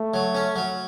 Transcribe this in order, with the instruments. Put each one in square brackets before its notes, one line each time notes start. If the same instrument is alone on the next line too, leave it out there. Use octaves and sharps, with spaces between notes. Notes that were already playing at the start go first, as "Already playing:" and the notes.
Already playing: [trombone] A3
[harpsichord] F#3
C#4
F#3